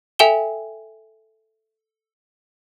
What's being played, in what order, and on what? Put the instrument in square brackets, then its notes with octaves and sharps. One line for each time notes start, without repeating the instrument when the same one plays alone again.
[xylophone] A4 E5 G5 G#5 E7 G7